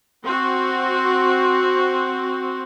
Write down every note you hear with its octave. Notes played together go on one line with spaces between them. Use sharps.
C4 F#4